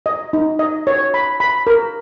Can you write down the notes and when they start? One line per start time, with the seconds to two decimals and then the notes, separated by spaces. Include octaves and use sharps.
0.06 D#5
0.33 D#4
0.59 D#5
0.87 C#5
1.14 B5
1.40 B5
1.67 A#4